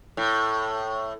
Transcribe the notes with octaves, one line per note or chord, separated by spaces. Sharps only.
A2